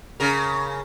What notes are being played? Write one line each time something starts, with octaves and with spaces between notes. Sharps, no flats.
C#3 A#4